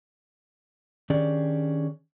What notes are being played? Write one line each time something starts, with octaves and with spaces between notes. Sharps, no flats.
D#3 C#4 D4 G4 G#4 D5